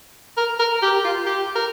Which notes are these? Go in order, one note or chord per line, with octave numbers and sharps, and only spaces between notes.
A#4
A#4
G4
F4
G4
A#4